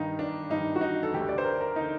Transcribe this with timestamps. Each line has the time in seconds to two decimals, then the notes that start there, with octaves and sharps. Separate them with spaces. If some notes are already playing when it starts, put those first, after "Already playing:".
Already playing: G2 D#3 D#4
0.19 D4
0.50 G2 D#3 D#4
0.76 F#4
0.81 D#4
1.03 A4
1.14 D2 D3 G4
1.29 D5
1.38 C5
1.44 A#4
1.61 A#4
1.76 D3 D#4